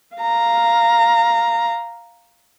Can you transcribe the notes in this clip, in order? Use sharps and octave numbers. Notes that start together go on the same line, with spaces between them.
F5 A#5